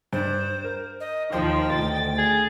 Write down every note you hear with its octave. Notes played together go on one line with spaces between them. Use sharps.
G2 D4 C5
A#4
D#5
D#2 D#3 F3 D#4 C5 G5
D2 A6
G#4